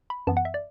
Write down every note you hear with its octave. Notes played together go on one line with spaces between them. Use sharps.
B5
F#2 E3 B3 A5
F#5
E5
D5